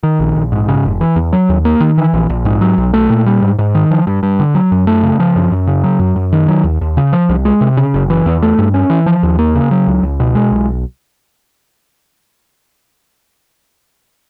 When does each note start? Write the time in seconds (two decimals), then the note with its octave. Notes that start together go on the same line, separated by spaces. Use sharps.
0.03 D#3
0.20 A#1
0.36 A#1
0.52 G#2
0.68 C#3
0.85 F1
1.01 E3
1.16 E2
1.33 F#3
1.49 D#2
1.65 A#3
1.80 D#3
1.98 E3
2.13 A#1
2.30 A#1
2.45 G#2
2.61 F#3
2.78 B1
2.93 A3
3.10 A#2
3.26 G3
3.42 G#2
3.59 G#2
3.75 D#3
3.91 F3
4.07 G2
4.23 G2
4.40 D3
4.55 F#3
4.72 F#2
4.87 A3
5.03 C#3
5.20 F3
5.36 F#2
5.52 F#2
5.67 C#3
5.84 F#3
6.00 F#2
6.16 F#2
6.33 D#3
6.48 F#3
6.64 D#2
6.81 D#2
6.97 C#3
7.13 F3
7.29 C2
7.45 G#3
7.61 C3
7.77 C#3
7.94 F#1
8.10 E3
8.26 E2
8.42 A3
8.59 G2
8.74 C#4
8.90 E3
9.06 F3
9.23 D#2
9.39 A#3
9.55 C#3
9.71 F#3
9.87 C#2
10.03 C#2
10.20 B2
10.35 G#3
10.52 B1